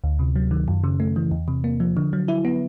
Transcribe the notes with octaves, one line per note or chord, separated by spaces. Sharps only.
D2
C3
F#3
D#3
F#2
C#3
A3
E3
E2
C3
A#3
F3
D3
F#3
E4
B3